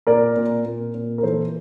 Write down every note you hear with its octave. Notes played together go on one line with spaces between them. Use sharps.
A#2 A#4 D5
A#2
A#2
A#2
A#4
E3 A4 C5